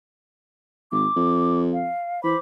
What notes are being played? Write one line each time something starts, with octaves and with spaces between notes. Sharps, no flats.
G#1 D6
F2
F5
E3 C5 B5 D6